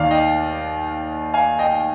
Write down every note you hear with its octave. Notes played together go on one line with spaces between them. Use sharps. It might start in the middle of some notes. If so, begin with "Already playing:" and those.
Already playing: D#2 D#3 D5 F5
D#5 G5
F5 G#5
D#5 G5